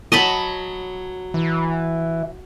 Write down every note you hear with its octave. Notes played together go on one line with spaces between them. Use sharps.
F#3 D#5 A5 B5
E3